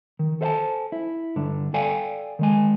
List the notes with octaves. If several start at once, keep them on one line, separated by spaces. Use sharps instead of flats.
D#3
A4 C5 E5 F5 G#5 A5
E4
G2 D3 D4
A4 D5 F5 G5 G#5
D#3 G#3 G#5